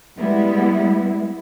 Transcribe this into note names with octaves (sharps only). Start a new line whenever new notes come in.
G3 G#3 B3 E4